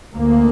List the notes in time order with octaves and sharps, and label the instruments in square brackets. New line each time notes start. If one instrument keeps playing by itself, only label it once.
[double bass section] D2 A#3